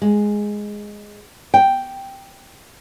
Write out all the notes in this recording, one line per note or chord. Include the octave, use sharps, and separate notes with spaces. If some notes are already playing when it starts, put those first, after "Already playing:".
G#3
G5